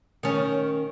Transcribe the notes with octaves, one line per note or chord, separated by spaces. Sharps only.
D#3 C#4